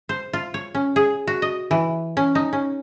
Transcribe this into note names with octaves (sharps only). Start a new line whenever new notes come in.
C5
F4
C#5
C#4
G#4
F#4
D#5
E3
C#4
D#4
C#4